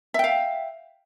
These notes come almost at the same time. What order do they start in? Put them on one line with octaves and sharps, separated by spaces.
E5 G5 F5